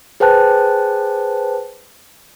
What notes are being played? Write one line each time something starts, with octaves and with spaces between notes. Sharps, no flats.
G#4 B4 C5 G5 A5 F#6